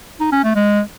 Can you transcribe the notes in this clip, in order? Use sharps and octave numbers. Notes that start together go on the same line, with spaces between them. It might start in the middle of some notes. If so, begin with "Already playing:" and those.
D#4
C#4
A3
G#3